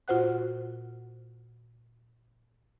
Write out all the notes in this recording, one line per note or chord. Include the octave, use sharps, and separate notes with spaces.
A#2 F4 F#4 C5 F#5 F#6